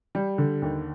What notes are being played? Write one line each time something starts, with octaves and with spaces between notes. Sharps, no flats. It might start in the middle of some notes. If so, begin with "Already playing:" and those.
G3
D3
D#2